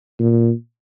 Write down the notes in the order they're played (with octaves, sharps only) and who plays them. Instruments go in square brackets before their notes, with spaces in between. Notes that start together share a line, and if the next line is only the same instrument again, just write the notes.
[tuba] A#2